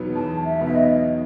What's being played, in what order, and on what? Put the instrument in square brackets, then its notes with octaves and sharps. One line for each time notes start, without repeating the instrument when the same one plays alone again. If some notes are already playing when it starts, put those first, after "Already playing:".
Already playing: [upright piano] E2 B2 F#3 B3 D#4
[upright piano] E2 [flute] A5
[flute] E5
[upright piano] B2 F#3 B3 D#4 [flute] E5
[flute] D#5